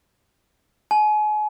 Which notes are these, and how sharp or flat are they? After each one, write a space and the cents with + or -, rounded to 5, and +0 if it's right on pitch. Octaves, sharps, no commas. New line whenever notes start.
G#5 +35